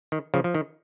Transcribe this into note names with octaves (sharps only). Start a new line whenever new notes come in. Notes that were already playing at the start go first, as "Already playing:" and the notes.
D#3
C#3 F3
F3
D#3